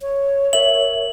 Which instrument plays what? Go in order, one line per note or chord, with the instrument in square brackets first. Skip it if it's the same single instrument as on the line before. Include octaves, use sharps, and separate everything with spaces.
[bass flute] C#5
[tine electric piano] A#4 E5 [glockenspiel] F#7